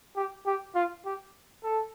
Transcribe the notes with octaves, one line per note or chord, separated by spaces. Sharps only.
G4
G4
F4
G4
A4